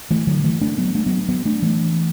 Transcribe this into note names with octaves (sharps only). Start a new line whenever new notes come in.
E3 A3
D3 F#3
E3 A3
A3 D4
F#3 B3
A3 D4
F#3 B3
F#3 B3
A3 D4
E3 A3